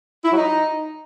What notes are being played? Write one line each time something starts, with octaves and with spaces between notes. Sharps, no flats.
E4
F#3
D#4